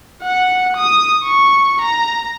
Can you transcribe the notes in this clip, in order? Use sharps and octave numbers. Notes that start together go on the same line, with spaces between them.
F#5
D#6
C#6
A#5